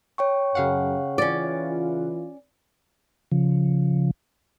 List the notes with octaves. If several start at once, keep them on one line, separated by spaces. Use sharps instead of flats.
C#5 G5 C#6
F#2 C#3 F5 F#5
E3 C#4 F4 D5
C#3 F3